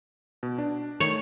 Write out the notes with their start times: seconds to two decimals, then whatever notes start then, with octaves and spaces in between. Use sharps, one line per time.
0.43 B2
0.58 D4
1.00 D#3 A3 C#5